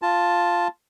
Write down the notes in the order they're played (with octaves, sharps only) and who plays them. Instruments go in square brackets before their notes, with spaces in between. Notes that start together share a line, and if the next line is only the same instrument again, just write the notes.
[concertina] F4 A5